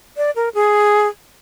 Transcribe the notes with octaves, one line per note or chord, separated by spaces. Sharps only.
D5
A#4
G#4